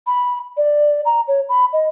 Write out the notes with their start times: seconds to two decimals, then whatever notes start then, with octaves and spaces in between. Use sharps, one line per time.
0.07 B5
0.57 D5
1.05 A#5
1.28 C#5
1.49 B5
1.73 D#5